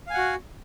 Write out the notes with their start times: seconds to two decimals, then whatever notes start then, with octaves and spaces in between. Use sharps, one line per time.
0.07 F5
0.10 G#5
0.14 F#5
0.18 F#4